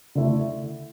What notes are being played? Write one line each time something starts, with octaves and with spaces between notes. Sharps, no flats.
D3 A3 E4